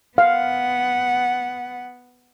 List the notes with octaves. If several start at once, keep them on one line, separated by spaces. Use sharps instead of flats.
B3 F5 F#5